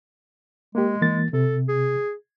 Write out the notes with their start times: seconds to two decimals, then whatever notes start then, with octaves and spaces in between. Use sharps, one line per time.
0.75 G#3 A#3 G4
1.02 E3 A#3 A6
1.33 C3 A4
1.68 G#4